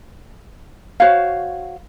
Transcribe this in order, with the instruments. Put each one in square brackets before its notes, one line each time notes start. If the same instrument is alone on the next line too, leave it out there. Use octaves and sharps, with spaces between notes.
[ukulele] F#4 C5 C#5 F5